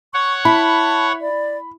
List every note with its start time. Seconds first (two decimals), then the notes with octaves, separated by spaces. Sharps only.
0.14 C#5 F#5 C#6
0.45 E4 A5 B5
1.21 D5